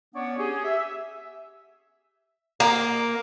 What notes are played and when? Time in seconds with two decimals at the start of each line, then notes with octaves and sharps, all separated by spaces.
0.14 B3 C#4 D4 C#5 D5 F#5
0.38 G4 G#4
0.65 E5
2.60 A#3